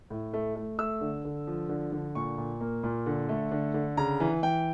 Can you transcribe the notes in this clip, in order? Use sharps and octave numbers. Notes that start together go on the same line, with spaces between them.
A2
A3
A3
A3 E6
D3
D3
F3
D3
D3
A#2 C#6
A#2
A#3
A#2
D3
A3
D3
D3
C#3 A#5
E3
E3 G5